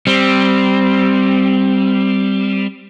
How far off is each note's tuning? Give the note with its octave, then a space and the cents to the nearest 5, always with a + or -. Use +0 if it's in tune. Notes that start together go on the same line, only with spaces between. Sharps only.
G3 +0 C4 +0